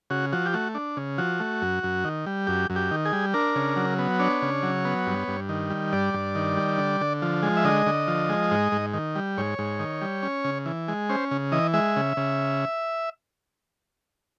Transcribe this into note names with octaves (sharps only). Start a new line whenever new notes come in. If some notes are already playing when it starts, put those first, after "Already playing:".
C#3 F#4
F3 F#4
G4
A3 F#4
D4
C#3
F3 F#4
A3
F#2
F#2
D#3
G3
F#2 G4
F#2
G4
D#3
G#4
G3
D4 A#4
C#3
F#3
B3
D4 C#5
C#3
F#3
B3
G2
G2
D#3
G3
G2 D5
G2
D#3
G3
D3
D3
F3
G#3
E5
D3 D#5
D3
F3
G#3
G#2
G#2
D#3
G3
G#2 C#5
G#2
D#3
G3
C#4
C#3
E3
G#3
C#4 C5
C#3
E3 D#5
G#3 E5
C#3
C#3